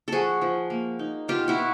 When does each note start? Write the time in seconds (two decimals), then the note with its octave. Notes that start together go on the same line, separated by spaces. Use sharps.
0.08 F3 F#4 G#4 A4
0.42 F3
0.70 A#3
0.99 D#4
1.28 B2 F4 G4
1.48 E4 F#4
1.58 B2